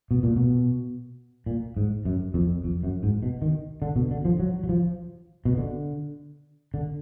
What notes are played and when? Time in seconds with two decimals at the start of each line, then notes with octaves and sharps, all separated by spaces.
0.11 B2
0.23 A#2
0.36 B2
1.46 A#2
1.77 G#2
2.05 F#2
2.34 F2
2.64 F2
2.84 F#2
3.03 G#2
3.23 B2
3.42 D#3
3.82 D3
3.96 B2
4.11 D3
4.25 F3
4.39 F#3
4.64 F#3
4.69 F3
5.45 B2
5.57 D3
6.74 D3